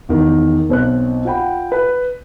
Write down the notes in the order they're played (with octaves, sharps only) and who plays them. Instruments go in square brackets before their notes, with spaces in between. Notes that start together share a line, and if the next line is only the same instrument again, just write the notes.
[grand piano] E2 D#3
B1 C4 F#6
F4 F#5 G5 B5
B4